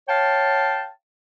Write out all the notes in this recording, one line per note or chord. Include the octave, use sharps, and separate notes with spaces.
C#5 F5 G5 A5